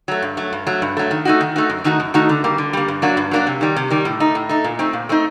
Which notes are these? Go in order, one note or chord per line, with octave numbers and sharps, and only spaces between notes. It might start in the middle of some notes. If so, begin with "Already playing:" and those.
F#3 A3
G2
F#3 A3
G2
F#3 A3
G2
F#3 A3
D#3
A3 D#4 F#4
D#3
A3 D#4 F#4
F#2
D#3 A3 D#4 F#4
F#2
D#3 A3 D#4 F#4
D3
G3 A#3
D3
G3 A#3
G2
F#3 A#3 D4 F#4
G2
F#3 A#3 D4 F#4
C3
D#3 G3
C3
D#3 G3
A2
A3 D#4
A2
A3 D#4
A#2
A3 C4 D#4
A#2
A3 C4 D#4